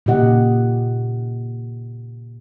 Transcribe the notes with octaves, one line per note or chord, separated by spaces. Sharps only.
A#2 C#3 D#4 G4 D#5 F#5